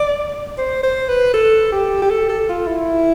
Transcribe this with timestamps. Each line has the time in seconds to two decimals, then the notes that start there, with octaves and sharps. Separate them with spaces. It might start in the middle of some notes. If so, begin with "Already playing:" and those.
Already playing: D5
0.58 C5
0.83 C5
1.09 B4
1.34 A4
1.72 G4
2.02 G4
2.10 A4
2.29 A4
2.49 F4
2.68 E4